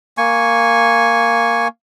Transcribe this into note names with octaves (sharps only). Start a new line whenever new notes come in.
A#3 G#5 C#6